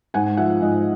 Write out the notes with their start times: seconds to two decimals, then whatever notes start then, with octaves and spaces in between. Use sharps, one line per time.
0.14 G#2 F#5 G#5
0.37 F3 E5 F#5
0.61 G#2 D#5